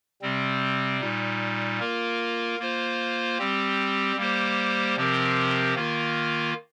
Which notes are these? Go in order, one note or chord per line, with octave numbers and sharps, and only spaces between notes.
C3 G3 C4
A#2 G3 D#4
A#3 F4 A#4
A#3 F4 C5
G3 C4 G4
G3 A#3 G4 C5
C3 F3 C4 G4 A#4
D#3 A#3 F4 A#4